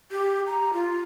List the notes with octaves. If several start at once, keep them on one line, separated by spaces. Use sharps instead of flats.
G4
A#5
F4